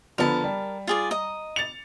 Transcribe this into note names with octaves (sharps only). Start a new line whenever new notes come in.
D3 F3 B3 A#4 A5
G3
F4 G#4 D5
D#5 A#5
A6 C#7 F7